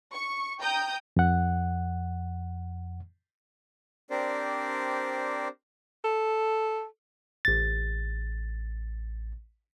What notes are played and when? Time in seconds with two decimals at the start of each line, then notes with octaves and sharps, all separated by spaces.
0.14 C#6
0.60 G5 A#5 D#6 G6
1.17 F2 F#5
4.10 C4 D4 G4 A#4 C5 D5
6.05 A4
7.45 A1 A6